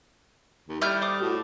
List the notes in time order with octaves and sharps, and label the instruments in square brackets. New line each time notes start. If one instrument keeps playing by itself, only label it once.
[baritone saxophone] D#2
[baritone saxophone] G3 [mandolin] A3 F6 G6 [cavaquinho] E4 E5
[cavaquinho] C5 D6 D#6
[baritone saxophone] A2 [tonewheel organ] F#4